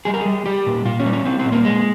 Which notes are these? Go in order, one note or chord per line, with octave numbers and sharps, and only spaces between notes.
G3 G#4
A#4
G3 G#4
G3 G4
A#2
A#2 F4
C#4
G3
C#4
G3 C4
C4
A#2
A#3
A#2 G#3